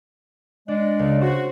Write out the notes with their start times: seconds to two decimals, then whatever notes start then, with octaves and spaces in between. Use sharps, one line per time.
0.68 G#3 D4 D5
0.99 C#2
1.21 F#4 C5